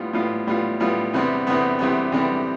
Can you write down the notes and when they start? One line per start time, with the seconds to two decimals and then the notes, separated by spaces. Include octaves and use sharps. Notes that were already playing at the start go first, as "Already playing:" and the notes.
Already playing: A2 G3 B3 F4
0.13 A2 G3 B3 F4
0.47 A2 G3 B3 F4
0.80 A2 G3 B3 F4
1.13 E2 C3 G3 B3
1.47 E2 C3 G3 B3
1.79 E2 C3 G3 B3
2.12 E2 C3 G3 B3